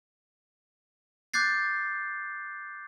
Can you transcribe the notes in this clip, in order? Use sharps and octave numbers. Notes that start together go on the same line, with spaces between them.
D6 F#6 G6 A6 C7